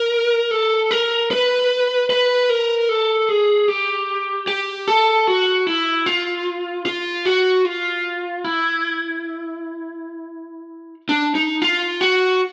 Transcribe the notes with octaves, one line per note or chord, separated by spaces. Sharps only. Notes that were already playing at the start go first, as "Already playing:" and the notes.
Already playing: A#4
A4
A#4
B4
B4
A#4
A4
G#4
G4
G4
A4
F#4
E4
F4
F4
F#4
F4
E4
D4
D#4
F4
F#4